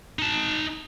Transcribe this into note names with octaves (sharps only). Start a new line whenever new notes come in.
D#4 A5